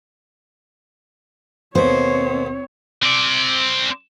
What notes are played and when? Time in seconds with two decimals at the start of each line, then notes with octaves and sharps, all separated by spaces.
1.75 D#2 B2 C4 C5 C#5
3.03 C4 D5